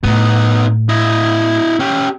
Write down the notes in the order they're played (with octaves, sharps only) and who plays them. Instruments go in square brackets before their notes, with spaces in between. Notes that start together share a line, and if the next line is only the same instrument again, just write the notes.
[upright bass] A2 [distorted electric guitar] B3 D#4
[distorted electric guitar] E4 D#5
C#4 G4